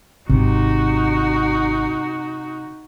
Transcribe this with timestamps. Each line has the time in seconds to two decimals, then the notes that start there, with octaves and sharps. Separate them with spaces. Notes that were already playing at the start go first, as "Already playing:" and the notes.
0.30 G#1 C3 D#4 F#4